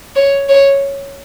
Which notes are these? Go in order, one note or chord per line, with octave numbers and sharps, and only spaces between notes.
C#5
C#5